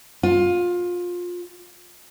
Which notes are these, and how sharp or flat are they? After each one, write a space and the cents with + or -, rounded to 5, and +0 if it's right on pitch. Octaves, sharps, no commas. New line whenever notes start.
F4 +20